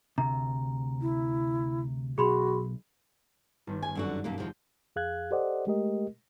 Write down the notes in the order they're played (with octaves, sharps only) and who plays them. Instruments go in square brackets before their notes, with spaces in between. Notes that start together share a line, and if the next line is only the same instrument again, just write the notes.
[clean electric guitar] D2 C3 [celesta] A#5
[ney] E4
[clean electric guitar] B1 [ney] F#4 [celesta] G#4 B5 C6
[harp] G1 D#3
[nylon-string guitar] G#5
F#2 D3 F#4
F#2 B2 A#3
[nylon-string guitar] E2 B2 F3 [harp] G6
[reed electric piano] F2 G#4 F5 F#6 G#6
G4 A4 C5 D5 D#5 F#5
G#3 A3 G4 A#4 D#5